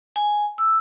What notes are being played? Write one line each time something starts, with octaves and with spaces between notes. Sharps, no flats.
G#5
E6